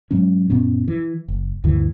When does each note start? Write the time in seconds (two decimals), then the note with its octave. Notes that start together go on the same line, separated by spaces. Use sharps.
0.11 G#2 F#3 G#3 C#4
0.50 F#2 A#2 B3 C#4
0.88 E3
1.28 F#1
1.64 D2 G2 D3 E3